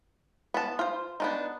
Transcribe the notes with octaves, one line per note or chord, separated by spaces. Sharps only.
B3 A5
F4 C5
B3 D4 D#4